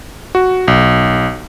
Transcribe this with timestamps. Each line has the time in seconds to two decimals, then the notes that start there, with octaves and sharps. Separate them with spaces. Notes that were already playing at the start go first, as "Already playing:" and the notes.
0.35 F#4
0.68 B1